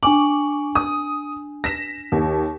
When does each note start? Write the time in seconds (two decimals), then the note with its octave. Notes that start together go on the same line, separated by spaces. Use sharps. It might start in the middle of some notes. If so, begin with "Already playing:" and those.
0.03 D4 G#5 C#6 D6 F#7
0.75 D#6
1.64 A#6 B6 E7
2.12 D#2